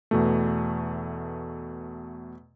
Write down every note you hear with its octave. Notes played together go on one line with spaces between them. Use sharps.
E2 B2 A3